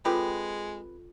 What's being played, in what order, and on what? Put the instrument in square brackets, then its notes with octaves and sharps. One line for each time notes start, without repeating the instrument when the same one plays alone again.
[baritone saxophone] G#3 [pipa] C4 G4 B4 [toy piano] F4 A4